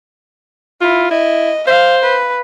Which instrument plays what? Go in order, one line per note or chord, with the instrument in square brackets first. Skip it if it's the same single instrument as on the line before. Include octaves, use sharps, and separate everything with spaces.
[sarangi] E4 [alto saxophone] F4
[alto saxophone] E4 [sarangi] D#5
[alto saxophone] C5 [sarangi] F5
[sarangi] B4